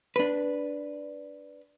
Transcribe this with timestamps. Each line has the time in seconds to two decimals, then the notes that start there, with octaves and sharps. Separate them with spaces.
0.16 D4 B4